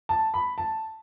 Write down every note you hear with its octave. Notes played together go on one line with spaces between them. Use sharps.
A5
B5
A5